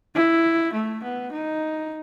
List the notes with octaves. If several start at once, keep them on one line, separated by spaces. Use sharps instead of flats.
E4
A3
B3
D#4